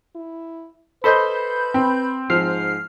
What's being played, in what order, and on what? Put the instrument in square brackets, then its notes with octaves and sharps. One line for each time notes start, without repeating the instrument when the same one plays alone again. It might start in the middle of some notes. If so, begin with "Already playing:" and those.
[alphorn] E4
[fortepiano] A4 C5 D#5 [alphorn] B4 [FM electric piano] B5 G6
[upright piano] C4
[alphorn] G#2 [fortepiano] F3 [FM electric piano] F6 C7